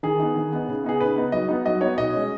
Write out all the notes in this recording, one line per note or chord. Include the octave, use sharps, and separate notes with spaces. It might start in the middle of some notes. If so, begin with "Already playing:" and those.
D#3 G#4
B3 D#4
D#3
B3 D#4
C#3
B3 D#4 G#4
C#3 B4
B3 D#4
F#3 D#5
B3 D#4
F#3 D#5
B3 D#4 C#5
B2 D#5
G#3 C#4